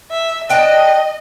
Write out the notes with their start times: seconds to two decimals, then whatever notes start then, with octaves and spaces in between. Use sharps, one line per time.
0.11 E5
0.49 D4 D#5 G5 A5